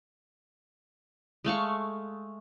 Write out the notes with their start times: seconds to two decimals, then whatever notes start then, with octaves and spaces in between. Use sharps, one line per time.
1.45 G#3 A3 F5 C#6